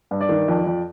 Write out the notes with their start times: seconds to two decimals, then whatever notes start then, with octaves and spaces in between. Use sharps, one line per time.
0.11 G2
0.21 D5
0.29 D#3
0.48 F2
0.66 F2